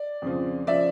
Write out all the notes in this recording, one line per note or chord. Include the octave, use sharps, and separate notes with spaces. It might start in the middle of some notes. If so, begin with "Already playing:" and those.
Already playing: D5
F2 C#3 F3
C#3 F3 D5 E5